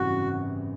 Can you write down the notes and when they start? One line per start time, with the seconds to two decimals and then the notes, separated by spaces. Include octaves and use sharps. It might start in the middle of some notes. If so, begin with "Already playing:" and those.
Already playing: G#1 F#2 C#3 E3 G3 F#4